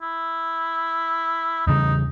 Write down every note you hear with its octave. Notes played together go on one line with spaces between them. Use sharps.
E4
E2 C#3 D#4